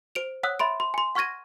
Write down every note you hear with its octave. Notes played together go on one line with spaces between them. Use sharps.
C5 D7 F7
C#5 F#5 D#6 E6 F#6
E5 B5 C6 D7
C6
G#5 C6
F#5 C#6 F6 G#6 A#6 D#7